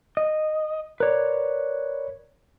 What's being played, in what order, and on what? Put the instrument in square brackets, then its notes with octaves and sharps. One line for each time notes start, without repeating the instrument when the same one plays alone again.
[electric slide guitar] D#5
[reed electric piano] A#4 D5 [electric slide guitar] B4 C#5